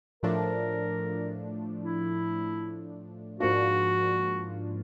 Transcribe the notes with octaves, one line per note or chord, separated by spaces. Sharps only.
A2 F3 A3 D4 A#4
E4
G#2 F3 A#3 D4 F4 F#4